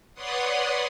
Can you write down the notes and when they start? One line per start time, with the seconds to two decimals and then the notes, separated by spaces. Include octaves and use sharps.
0.14 B4 C#5 D5 F#5 C6 D#6